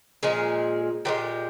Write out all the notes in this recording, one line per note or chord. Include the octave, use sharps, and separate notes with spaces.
A#2 F3 G#3 G#4
A#2 F3 G#3 G4